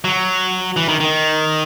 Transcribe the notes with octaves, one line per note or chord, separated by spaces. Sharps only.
F#3
E3
D#3
D#3